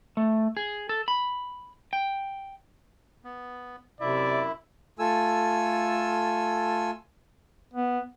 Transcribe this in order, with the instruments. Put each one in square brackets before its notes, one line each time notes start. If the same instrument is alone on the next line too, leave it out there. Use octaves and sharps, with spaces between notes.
[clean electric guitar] A3
G#4
A4
B5
G5
[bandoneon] B3
[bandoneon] F#2 E4 E5 [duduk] C3 [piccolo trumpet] D5
[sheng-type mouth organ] A3 F4 A4 G#5 E6
[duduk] B3